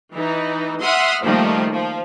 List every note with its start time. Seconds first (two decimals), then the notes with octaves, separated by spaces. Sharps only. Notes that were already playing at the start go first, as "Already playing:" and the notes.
0.12 E3 D#4
0.82 E5 F#5 C6 D#6 F6
1.21 D#3 F3 G3 A3 A#3
1.73 F3